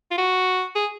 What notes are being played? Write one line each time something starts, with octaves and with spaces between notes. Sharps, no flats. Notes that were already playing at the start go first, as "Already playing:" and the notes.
F4
F#4
G#4